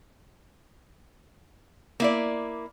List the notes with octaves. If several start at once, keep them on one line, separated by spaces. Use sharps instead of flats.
A#3 E4 D5